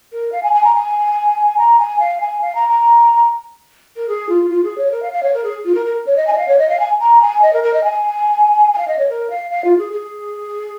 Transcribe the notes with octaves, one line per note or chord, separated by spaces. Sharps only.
A#4
F5
G#5
G#5
A#5
G#5
A#5
G#5
F5
G#5
F5
A#5
A#5
A#4
G#4
F4
F4
G#4
C#5
A#4
F5
F5
C#5
A#4
G#4
F4
A#4
A#4
C#5
D#5
G#5
D#5
F5
C#5
D#5
F5
G#5
A#5
G#5
D#5
A#4
A#4
D#5
G#5
G#5
F5
D#5
C#5
A#4
F5
F5
F4
G#4
G#4